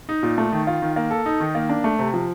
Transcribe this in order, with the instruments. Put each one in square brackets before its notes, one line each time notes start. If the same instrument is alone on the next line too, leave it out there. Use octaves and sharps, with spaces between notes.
[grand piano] D#4
A#2
A3
D#3
F4
D#3
A#3
A4
D#4
D#3
A#3
D4
A3
C3
F3